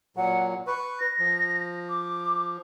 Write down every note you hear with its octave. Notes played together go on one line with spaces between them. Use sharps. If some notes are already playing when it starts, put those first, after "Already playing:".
A#2 F#3 F#5
B4 C#6
A#6
F3
D6